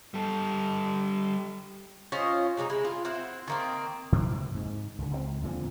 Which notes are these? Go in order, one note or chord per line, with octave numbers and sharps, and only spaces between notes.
G3 A4
C#4 F4 C5 D#5
C3 G#3 C#4 D#4
G#3 E4
F4
C4 E4 C5 F#5
D#3 A#3 C4
G#1 F2 C3 A#3
G#2
C#2 D3
C#2 E3 C4
E2 A#2 D3 F3